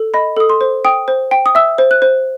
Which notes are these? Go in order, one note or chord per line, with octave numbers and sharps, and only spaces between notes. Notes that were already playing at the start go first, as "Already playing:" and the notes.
Already playing: A4
D#5 B5
A4 D#6
C6
C5
G5 D#6
C5
G5
D#6
E5 E6
C5
F#6
C5